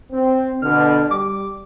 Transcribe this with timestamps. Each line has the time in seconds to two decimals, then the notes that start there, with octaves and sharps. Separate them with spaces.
0.12 C4
0.62 B2 D3 F6
1.11 G3 D6